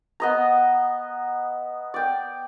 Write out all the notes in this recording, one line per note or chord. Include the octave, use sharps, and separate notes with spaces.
B3 D#5 A#5
D5 G5